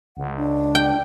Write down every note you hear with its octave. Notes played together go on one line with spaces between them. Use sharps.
C#2 F#5
D4
G5